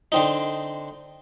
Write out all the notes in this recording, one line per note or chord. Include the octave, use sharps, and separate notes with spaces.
D3 C4 D#4